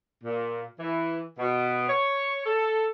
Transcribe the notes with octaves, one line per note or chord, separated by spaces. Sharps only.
A#2
E3
B2
C#5
A4